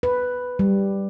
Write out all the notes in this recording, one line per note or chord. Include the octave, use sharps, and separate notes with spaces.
B4
G3